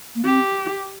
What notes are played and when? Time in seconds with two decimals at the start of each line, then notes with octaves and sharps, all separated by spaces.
0.15 A#3
0.24 C4 G4